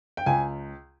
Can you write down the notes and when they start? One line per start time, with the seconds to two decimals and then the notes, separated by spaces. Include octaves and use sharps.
0.17 G5
0.26 C#2 G#5